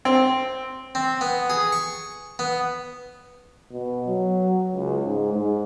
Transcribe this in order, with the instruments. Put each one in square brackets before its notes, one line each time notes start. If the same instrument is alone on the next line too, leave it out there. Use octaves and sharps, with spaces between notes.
[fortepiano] C4
[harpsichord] C4
B3
G#4
C#6
B3
[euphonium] B2
F#3
C#2
G#2
G#2